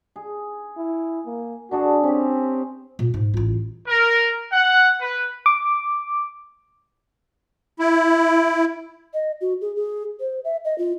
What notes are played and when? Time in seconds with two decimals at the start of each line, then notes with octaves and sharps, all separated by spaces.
0.16 G#4
0.77 E4
1.26 A#3
1.71 D3 D4 F#4 G#4
2.04 C4 C#4 G4
2.99 A#2
3.14 G#2
3.34 A1 F4
3.87 A#4
4.52 F#5
5.00 B4
5.46 D6
7.79 E4
9.14 D#5
9.41 F#4
9.61 G#4
9.76 G#4
10.20 C5
10.45 E5
10.65 D#5
10.78 F4